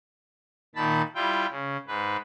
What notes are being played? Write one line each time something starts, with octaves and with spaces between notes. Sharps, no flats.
A#2 D#3 A5 B5
G3 E4 F4 G5
C#3
G#2 B4